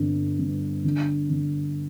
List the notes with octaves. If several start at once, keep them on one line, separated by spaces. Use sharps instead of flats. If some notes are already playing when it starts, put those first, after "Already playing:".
Already playing: G1 D3 C4
G2
D3
D3